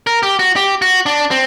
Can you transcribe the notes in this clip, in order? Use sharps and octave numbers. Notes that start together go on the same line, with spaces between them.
A#4
G4
F#4
G4
F#4
D4
C4